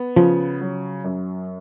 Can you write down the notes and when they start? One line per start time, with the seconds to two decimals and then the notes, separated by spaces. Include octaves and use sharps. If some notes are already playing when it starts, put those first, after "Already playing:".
Already playing: B3
0.16 C#3 F3
0.61 F#3
1.04 F#2